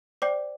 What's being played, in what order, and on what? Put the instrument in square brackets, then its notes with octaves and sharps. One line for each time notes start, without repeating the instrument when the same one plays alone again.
[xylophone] C5 D5 G5 D6